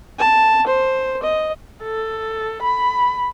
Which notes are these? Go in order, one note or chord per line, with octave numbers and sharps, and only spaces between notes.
A5
C5
D#5
A4
B5